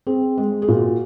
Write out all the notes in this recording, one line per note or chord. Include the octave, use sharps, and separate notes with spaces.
C4 G#4
G#3
G#4
A#2 F#4